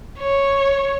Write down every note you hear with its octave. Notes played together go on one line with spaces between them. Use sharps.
C#5